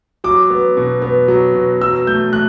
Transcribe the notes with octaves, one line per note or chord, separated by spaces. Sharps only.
F#3 D6
B3
B2
B3
F#3
B2
F#3 E6
A3 G6
A3 F#6